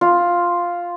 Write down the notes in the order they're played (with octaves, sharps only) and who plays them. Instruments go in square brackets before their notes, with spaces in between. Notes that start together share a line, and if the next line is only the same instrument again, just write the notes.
[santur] F4